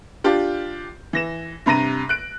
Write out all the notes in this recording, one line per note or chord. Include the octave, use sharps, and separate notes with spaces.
D4 F4 G4
E3 A#6 E7
G2 C3 A#5 A#6 D#7
F#6 D7